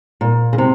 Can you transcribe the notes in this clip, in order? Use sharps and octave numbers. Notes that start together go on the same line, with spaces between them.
A#2
C#3
C3